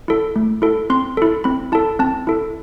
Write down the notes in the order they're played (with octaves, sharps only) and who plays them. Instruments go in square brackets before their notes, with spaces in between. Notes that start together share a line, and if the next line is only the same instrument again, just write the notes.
[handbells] E4 A4
A3
E4 A4
C4 C6
E4 A4
C4 B5
E4 A4 A5
C4 A5
E4 A4